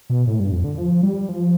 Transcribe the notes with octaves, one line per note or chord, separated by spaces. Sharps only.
B2
A2
G2
F2
D3
F3
G3
F3